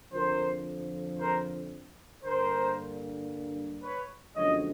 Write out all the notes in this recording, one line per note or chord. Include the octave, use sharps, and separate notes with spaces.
F2 D3 F3 A#4 C5
A#4 C5
G2 D3 G3 A#3 A#4 C5
B4 C#5
G1 F#2 D3 F3 G#3 C#5 D#5